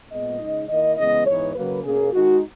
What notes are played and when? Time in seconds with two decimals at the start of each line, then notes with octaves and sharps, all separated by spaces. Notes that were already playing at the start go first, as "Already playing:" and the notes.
0.11 A#2 G#3 B3 D#5
0.40 C#3 G#3 D#4
0.69 D#3 A#3 E4 D#5
0.97 C#3 E3 G#3 B3 D#5
1.27 G#2 E3 B3 D#4 C#5
1.55 C#3 F#3 A#3 B4
1.84 B2 A#3 C#4 G#4
2.12 D#3 G#3 D#4 F#4